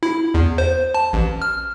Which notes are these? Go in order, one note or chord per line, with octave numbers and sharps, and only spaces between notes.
E4
E2
C5
A5
A1
F6